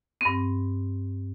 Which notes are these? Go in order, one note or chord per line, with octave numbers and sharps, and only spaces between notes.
G2 C4